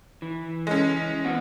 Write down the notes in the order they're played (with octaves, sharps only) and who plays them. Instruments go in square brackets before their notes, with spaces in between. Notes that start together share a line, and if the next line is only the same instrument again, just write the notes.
[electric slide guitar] E3
[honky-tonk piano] G#3 C#4
[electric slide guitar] B3 C4 F#4